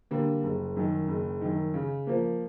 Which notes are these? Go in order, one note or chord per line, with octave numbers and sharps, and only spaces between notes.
D3 G3 A#3
F#1
F#2 D#3
F#1
F#2 D#3
C#3
F3 A#3